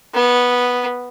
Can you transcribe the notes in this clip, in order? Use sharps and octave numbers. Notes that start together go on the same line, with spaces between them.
B3